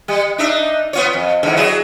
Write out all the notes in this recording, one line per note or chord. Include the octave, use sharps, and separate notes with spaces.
G3
D4 D#4 E5
B3 F4 C#5
F2
E2 G#2 D3
F#3 E4 G#4